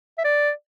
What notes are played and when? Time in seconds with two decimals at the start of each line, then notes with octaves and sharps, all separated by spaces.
0.18 E5
0.24 D5